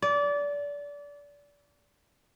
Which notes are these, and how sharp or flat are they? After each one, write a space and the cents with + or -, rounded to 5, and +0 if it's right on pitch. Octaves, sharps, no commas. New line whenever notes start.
D5 -25